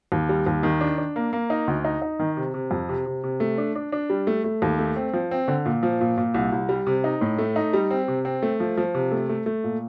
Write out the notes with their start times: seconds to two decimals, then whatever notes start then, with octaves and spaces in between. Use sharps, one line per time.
0.12 D#2
0.29 G3
0.47 D#2
0.63 D#3
0.81 D4
0.98 D4
1.16 A#3
1.33 A#3
1.50 D#4
1.68 D2
1.85 D#4
2.02 D#4
2.19 D#3
2.37 C3
2.54 C3
2.71 F2
2.89 C3
3.06 C3
3.23 C3
3.40 A3
3.58 D4
3.75 D4
3.92 D4
4.10 G3
4.27 A3
4.44 A3
4.62 D#2
4.79 A3
4.96 C4
5.13 F3
5.31 C4
5.48 D3
5.65 A#2
5.83 F3
6.01 A#2
6.17 A#2
6.34 C2
6.52 C2
6.69 G3
6.86 C3
7.04 D#4
7.21 A2
7.38 A3
7.56 D#4
7.73 G3
7.91 C4
8.08 C3
8.25 C4
8.43 A3
8.60 F3
8.77 F3
8.94 C3
9.12 A3
9.29 A3
9.46 A3
9.64 A#2